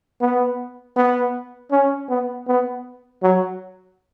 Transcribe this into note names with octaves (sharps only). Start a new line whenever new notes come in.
B3
B3
C#4
B3
B3
F#3